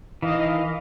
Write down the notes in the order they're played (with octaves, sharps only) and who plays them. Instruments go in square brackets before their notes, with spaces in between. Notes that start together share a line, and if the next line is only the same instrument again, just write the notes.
[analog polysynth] D#3 D#5 F5 [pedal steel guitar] E3